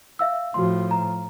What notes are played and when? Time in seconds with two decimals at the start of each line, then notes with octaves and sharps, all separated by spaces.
0.19 E5 F5 E6
0.54 A2 F3 F#4 C6
0.91 A#5